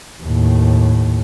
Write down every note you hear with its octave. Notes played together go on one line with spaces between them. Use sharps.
D#2 A2